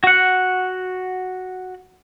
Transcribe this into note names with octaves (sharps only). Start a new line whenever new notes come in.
F#4 F#5